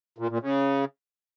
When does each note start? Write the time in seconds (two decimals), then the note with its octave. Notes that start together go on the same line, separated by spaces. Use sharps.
0.18 A#2
0.30 A#2
0.41 C#3